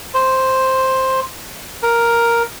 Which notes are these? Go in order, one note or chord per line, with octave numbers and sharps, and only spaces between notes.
C5
A#4